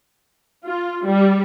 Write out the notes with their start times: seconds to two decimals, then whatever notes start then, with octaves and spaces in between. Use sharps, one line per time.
0.65 F4
1.06 G3